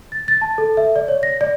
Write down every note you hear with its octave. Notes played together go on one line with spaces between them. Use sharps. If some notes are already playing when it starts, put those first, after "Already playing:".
A6
A6
A5
A4
E5
D5
C#5
A#6
D5